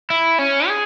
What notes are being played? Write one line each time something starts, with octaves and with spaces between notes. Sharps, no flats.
E4
C#4
G#4